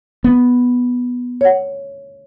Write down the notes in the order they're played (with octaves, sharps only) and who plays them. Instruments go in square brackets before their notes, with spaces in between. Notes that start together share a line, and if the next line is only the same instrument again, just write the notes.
[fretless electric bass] B3
[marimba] C#5 F#5